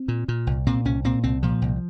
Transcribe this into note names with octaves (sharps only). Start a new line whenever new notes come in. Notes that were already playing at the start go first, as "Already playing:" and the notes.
Already playing: C4
A#2
A#2
C2
A#2 C4
C2 C#4
A#2 C4
C2 C4
A#2 F3
C2